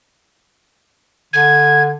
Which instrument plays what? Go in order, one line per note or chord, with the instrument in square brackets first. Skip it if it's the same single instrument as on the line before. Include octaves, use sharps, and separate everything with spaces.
[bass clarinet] D3 [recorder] G#6